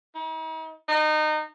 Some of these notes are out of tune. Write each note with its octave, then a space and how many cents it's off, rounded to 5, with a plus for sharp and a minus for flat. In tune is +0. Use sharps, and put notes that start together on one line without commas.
D#4 +45
D#4 -25